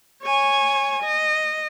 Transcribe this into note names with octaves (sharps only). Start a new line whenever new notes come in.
C#5 G#5
D#5